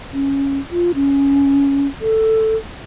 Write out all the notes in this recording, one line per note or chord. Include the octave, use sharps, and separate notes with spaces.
C#4
F4
C#4
A4